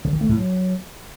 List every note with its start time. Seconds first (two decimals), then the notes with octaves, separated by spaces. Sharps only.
0.05 D3
0.13 D#3
0.21 A3
0.29 A2
0.37 F#3